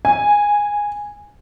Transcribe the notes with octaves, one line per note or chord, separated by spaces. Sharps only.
G#5